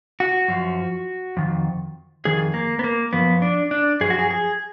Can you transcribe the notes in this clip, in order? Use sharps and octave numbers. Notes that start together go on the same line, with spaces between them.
F#4
F#2 F3
F2 D#3
F2 D#3 G#4
A#3
B3
A#3
F#2 F3 B3
D4
D4
F#2 F3 G#4
F#4
G#4
G#4